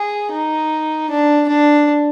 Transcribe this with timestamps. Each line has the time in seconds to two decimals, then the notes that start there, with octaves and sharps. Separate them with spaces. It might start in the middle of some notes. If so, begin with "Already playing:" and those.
Already playing: G#4
0.32 D#4
1.10 D4
1.48 D4